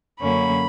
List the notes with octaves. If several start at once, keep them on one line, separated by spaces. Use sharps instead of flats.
F#2 D3 F#3 A#3 C#4 B5